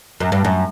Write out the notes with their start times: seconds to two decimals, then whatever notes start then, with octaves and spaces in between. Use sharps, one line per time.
0.20 F#2
0.32 G2
0.45 F#2